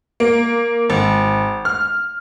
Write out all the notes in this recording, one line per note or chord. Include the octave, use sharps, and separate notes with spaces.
A#3
G#1
F6